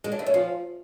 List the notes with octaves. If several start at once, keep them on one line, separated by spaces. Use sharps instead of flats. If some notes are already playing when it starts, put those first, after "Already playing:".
G#3
D4
A3
C#4
F3